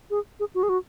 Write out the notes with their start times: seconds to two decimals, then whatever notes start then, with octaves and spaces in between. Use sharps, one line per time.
0.11 G#4
0.40 G#4
0.55 F#4
0.63 G#4
0.69 F#4